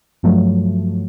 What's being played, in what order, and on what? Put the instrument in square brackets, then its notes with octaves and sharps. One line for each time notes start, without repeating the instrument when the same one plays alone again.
[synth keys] G2 F3 F#3 A3